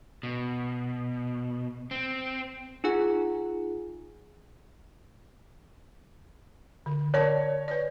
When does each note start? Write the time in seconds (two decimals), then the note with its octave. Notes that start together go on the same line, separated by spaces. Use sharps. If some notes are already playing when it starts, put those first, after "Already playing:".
0.23 B2
1.91 C4
2.84 D#4 F4 G#4 F#5
6.86 D3
7.14 A#4 C#5 D5 A5
7.68 B4 D5